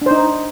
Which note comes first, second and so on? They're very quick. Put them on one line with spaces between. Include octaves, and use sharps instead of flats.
D4 C5 D#4